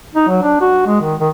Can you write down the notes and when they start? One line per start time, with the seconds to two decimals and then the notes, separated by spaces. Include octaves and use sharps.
0.15 D#4
0.28 F#3
0.43 D4
0.61 F#4
0.86 G#3
1.01 D#3
1.20 D#3